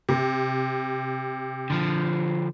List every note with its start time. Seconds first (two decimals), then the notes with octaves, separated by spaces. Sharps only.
0.09 C3
1.70 D3 F3